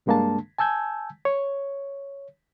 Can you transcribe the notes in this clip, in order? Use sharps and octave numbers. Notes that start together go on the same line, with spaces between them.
C2 G2 G#3 A#3 D4 A5
G#5 A5 E6 G6 G#6
C#5